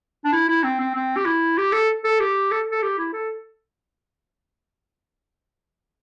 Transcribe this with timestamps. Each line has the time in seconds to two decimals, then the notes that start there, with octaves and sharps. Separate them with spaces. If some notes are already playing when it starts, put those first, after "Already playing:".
0.25 D4
0.32 E4
0.48 E4
0.64 C4
0.80 C4
0.94 C4
1.16 G4
1.25 E4
1.58 G4
1.72 A4
2.04 A4
2.20 G4
2.51 A4
2.71 A4
2.82 G4
2.98 E4
3.13 A4